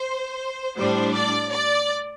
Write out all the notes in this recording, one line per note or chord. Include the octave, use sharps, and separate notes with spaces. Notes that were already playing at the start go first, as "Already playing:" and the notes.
Already playing: C5
A2 G3 D4 C5
D5
D5